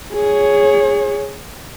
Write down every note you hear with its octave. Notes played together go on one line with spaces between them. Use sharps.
G#4 C#5